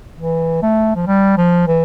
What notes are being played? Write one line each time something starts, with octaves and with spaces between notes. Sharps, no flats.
E3
A3
F3
G3
F3
E3